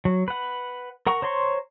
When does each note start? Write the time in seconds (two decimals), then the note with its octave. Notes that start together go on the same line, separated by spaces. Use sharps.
0.05 F#3
0.28 B4 F#5
1.07 A#4 F#5 A#5 C#6
1.22 C5 C#5 A#5 C6 C#6